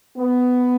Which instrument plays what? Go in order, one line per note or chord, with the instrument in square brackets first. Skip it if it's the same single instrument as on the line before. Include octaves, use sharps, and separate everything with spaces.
[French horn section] B3